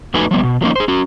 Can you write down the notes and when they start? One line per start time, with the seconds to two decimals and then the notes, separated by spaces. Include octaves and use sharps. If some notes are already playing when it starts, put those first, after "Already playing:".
0.14 F2 A3 D#4 F#4 B4 G#5
0.31 F3 G3 B3
0.43 B2
0.61 F3 F#3 A3 A#3 C#4 D#4
0.76 G#4 C5
0.88 C#4 F#4